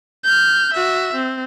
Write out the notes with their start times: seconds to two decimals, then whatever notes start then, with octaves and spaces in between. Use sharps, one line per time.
0.24 F6 G6
0.73 F#4 E5
1.15 C4